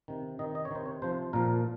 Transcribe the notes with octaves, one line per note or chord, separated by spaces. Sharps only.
C3 D#3
C3 D#3 D#5
D#5
C#5
C3 D#3 C5
C#5
C3 F3 C5
A#2 F3 A#4